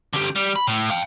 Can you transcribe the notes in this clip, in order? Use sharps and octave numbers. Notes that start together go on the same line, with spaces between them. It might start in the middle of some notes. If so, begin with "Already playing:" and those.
D3 G4
G3
B5
A2
F5 G5